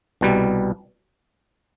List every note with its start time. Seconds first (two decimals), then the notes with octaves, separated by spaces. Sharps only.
0.21 C2 B2 G3